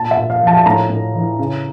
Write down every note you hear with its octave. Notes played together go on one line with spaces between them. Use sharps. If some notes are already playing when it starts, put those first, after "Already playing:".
Already playing: A#2 A5
E5
A#2
F5
F3 A5
A5
A2 A#5
A2
E3
C#3